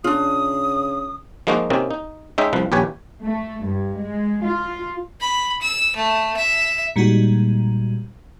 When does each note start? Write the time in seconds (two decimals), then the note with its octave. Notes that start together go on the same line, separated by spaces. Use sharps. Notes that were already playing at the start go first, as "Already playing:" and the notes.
0.04 C#3 D4 F4 D#6
1.47 F3 G#3 A#3 D#4 F#4
1.70 C3 A#3 C4 C#4 D#4
1.91 D#4
2.38 G#3 C#4 D#4 E5 G5
2.53 C2 F3 B4
2.72 A#1 D#2 G4 B4 C#5 G#5
3.23 A3
3.64 G2
4.00 G#3
4.43 F4
5.20 B5
5.62 E6
5.96 A3
6.37 E5
6.96 A#2 G3 G#3 D#4 F#4